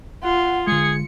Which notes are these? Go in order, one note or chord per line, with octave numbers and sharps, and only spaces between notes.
F4 F#5
D3 G#3 G#4 C#7